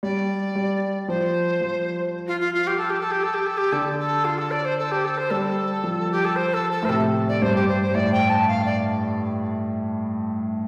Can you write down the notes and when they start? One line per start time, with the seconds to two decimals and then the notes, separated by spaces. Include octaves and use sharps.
0.03 G3 D5
0.56 G3
1.08 F3 C5
1.61 F3
2.28 F4
2.40 F4
2.54 F4
2.67 G4
2.78 A4
2.90 G4
3.00 A4
3.11 G4
3.23 A4
3.34 G4
3.46 A4
3.57 G4
3.72 D3 A4
3.99 A4
4.25 F4
4.38 A4
4.51 D5
4.65 C5
4.78 A4
4.91 G4
5.04 A4
5.18 C5
5.30 G3 A4
5.84 F3
6.11 G4
6.25 A4
6.36 C5
6.54 A4
6.71 A4
6.83 A2 C5
6.89 C3 A4
7.29 D5
7.42 G2 C5
7.56 G4
7.68 C5
7.82 C5
7.94 A2 D5
8.12 G5
8.29 A5
8.48 F5
8.66 D5